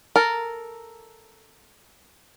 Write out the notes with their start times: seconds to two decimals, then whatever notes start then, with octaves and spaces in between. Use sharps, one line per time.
0.16 A4 A#4